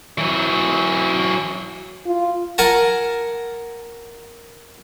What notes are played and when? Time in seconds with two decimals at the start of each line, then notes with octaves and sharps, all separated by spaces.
0.18 E3 F#3
2.06 F4
2.58 A#4 F#5 G#5 A5